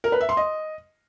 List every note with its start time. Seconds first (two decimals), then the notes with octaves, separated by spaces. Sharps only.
0.04 A#4
0.12 B4
0.21 E5
0.29 C6
0.37 D#5